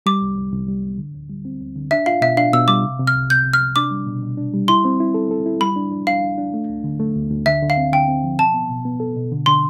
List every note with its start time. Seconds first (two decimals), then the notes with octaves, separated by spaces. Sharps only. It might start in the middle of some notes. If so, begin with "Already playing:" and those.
0.06 G3 D6
0.22 C2
0.37 C2
0.53 C2
0.68 G3
0.83 C2
0.98 D3
1.15 D2
1.30 G3
1.45 C4
1.61 D2
1.76 D3
1.91 D4 E5
2.06 F4 F5
2.21 B2 E5
2.37 D4 F5
2.53 B2 E6
2.68 G3 D6
2.84 C3
2.99 C3
3.07 F6
3.15 C2
3.30 C3 G6
3.45 C3
3.53 F6
3.61 C3
3.76 D4 D6
3.91 G3
4.06 B2
4.22 B2
4.37 D4
4.54 G3
4.68 E4 C6
4.85 C4
5.00 E4
5.14 A4
5.31 A4
5.46 E4
5.61 G3 B5
5.76 D4
5.92 D4
6.07 D4 F5
6.23 D4
6.38 D4
6.54 A3
6.69 D2
6.84 D3
7.00 A3
7.16 D2
7.30 D2
7.46 D3 E5
7.62 D3
7.70 F5
7.77 C4
7.92 D3 G5
8.09 C4
8.24 F3
8.39 B2 A5
8.54 B3
8.70 B2
8.85 B3
9.00 A4
9.16 B2
9.32 D3
9.46 D3 C6